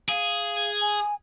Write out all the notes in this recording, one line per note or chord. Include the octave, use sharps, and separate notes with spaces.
G#4 F5
G#5